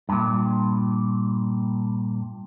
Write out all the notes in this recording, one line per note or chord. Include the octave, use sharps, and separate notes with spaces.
G2 A#2